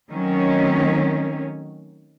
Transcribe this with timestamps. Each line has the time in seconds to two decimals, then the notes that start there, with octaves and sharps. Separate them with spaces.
0.11 D#3 F#3 A3 C4 C#4